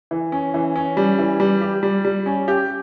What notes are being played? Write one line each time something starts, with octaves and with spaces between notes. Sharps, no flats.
E3
C#4
E3
C#4
G3
E3
G3
G4
G3
G3
C#4
G4